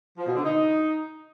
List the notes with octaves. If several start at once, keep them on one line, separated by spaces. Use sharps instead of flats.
F3
B2
D3
D#4